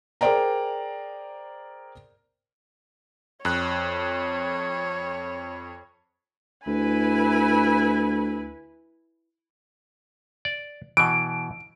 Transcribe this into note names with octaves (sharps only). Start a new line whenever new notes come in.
G#4 A#4 C5 D5 G5 A#5
F2 C#5 F#6
D2 E4 B4 G#5
D5
B2 E3 D7